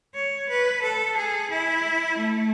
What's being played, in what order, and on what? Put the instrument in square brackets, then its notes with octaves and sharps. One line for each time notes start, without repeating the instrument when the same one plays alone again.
[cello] C#5
B4
A4
G#4
E4
A3